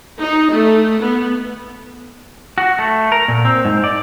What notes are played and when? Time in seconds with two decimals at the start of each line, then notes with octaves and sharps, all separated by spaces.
0.19 D#4
0.51 A3
1.00 B3
2.58 F#4
2.79 A3
3.12 A#4
3.28 A#2
3.45 C4
3.65 G#2
3.84 D5